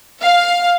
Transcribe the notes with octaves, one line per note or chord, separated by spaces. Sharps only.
F5